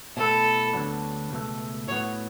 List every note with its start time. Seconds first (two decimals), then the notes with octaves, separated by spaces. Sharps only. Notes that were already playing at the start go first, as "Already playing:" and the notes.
0.17 B2 A3 E4 A4
0.73 D2 D3 F#3 B3 D4
1.30 C#2 B2 A3
1.88 A2 F#3 B3 C#5